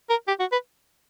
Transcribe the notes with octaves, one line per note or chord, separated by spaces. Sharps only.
A#4
G4
F#4
B4